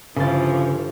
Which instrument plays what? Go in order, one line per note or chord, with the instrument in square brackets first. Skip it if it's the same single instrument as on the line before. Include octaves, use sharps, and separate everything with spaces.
[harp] G1 C6 A6 [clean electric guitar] C#3 [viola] E3 F3